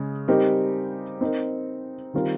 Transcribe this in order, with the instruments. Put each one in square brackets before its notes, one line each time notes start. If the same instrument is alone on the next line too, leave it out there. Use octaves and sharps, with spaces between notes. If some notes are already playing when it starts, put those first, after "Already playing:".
Already playing: [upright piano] C#3 G#3
G3 C4 D#4 G4 A#4
C4 D#4 A#4
D#3 G3 C4 F4 A#4